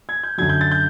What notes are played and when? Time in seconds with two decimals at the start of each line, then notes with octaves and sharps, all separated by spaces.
0.09 G#6
0.23 G6
0.38 F#2 D3 F#3 G#6
0.49 G6
0.61 A6
0.71 G6